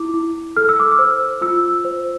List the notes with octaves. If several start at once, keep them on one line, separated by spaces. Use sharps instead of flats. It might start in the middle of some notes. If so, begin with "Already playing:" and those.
Already playing: E4 D6
E4
A4 F6
E6
D6
E6
C5
F4 E6
C5